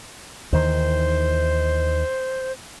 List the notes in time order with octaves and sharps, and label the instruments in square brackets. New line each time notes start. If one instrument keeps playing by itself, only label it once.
[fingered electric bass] D#2 D#3 E3 [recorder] C5